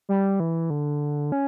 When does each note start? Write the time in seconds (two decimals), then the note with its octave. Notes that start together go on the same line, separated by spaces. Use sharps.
0.09 G3
0.40 E3
0.70 D3
1.32 C#4